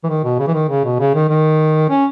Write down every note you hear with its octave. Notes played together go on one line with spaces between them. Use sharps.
E3
D#3
B2
C#3
E3
D#3
C#3
B2
C#3
D#3
D#3
C#4